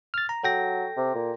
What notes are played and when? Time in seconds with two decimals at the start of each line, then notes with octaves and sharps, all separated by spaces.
0.14 F6 A6
0.29 A#5
0.44 F#3 A4 G5 A#6
0.97 C3
1.15 A#2